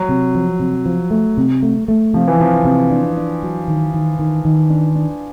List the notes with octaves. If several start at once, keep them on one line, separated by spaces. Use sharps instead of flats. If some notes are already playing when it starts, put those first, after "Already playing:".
Already playing: F#3
C3
F3
C3
F3
A3
C3
A3
A3
C3 F3
E3
C3 F3
C3
D4
D4
F#3
D#3
D#3
D#3
D#3
D4
D4